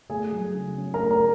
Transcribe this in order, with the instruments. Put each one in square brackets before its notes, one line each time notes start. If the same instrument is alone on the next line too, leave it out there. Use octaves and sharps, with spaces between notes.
[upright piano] A3 G#4 G#5
F#3
C#3
C#4
A#4 A#5
A3
A#4 A#5